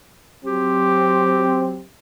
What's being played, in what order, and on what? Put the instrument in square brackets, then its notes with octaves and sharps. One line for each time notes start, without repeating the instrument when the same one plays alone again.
[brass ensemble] F#3 C4 [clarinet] G4